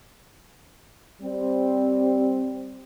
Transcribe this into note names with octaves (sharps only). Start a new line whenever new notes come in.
G3 C4